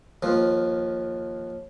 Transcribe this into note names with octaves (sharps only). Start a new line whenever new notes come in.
D#2 F3